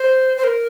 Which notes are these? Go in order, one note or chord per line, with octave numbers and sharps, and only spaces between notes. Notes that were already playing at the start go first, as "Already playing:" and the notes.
Already playing: C5
C5
A#4